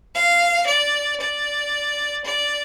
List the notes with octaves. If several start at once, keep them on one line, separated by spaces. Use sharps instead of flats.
F5
D5
D5
D5